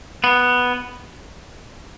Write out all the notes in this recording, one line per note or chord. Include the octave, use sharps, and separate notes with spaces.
B3